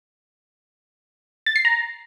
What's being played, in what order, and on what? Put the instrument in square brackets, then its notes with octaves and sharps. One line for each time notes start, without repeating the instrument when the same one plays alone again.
[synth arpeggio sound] A6
C7
A#5